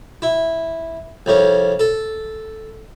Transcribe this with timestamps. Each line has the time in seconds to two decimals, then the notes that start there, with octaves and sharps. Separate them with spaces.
0.22 E4
1.26 C2 F2 C#4
1.79 A4